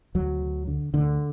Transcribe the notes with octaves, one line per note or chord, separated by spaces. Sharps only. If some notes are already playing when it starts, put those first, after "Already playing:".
D2 F#3
D3
D3
D2 D3